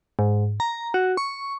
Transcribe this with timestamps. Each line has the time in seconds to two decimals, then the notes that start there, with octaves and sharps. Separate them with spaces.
0.19 G#2
0.60 A#5
0.94 F#4
1.17 C#6